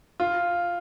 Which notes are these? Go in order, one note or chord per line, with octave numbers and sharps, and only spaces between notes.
F4